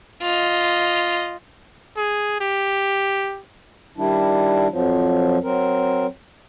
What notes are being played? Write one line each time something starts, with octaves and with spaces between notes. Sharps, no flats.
F4 D#5
G#4
G4
D#3 G3 D4 E4
F2 F3 F#3
F#3 C4 A#4